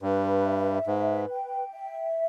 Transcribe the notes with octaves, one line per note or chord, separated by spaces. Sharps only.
G2 B4
E5
G#2 B4
G5
E5